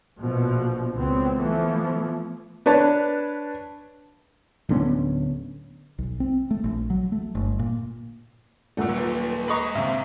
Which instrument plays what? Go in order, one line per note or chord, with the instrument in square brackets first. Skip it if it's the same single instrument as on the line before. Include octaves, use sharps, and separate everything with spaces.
[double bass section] A#1 B2 F3
C#2 B3 C4
E3 F3 A3 B3
[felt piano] D4 B4 C#5 A5
[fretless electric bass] D1 D3 B3 C#4
[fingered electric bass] B1
C4
A3
A#1
F#3
A3
G1
A#2
[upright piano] D#1 F#5 E6 [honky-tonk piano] A#2 A3
[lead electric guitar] F#3 B4
[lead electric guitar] G#2 A#5 [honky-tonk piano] B4 D#5 C#6
[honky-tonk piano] A#1 C3 [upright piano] E5 F5